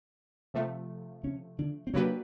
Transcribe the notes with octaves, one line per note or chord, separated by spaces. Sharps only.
C3 F3 A3
C#3 C#4
D3 D4
C4
C#3 F#3 A#3 C#4 D4 G4 B4